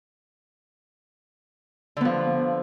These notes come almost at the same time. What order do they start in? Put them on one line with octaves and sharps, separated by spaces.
D3 B3 F3